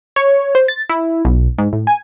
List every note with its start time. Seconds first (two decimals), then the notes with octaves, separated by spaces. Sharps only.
0.16 C#5
0.55 C5
0.68 A6
0.89 E4
1.25 B1
1.58 G#2
1.73 A2
1.87 G#5